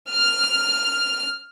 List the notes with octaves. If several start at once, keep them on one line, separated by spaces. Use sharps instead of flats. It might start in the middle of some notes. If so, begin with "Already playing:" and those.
F6